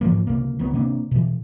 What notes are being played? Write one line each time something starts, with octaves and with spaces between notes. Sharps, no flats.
G#2 E3 F3 A#3
C#2 C3 A#3
D#3 B3
C3 A#3 C4 D4
B2 E3